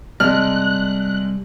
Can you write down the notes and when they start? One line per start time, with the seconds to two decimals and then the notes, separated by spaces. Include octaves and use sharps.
0.20 C3 G3 G#3 D5 A5 F6 F#6